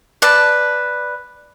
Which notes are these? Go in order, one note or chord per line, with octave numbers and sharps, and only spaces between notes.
B4 D5 A5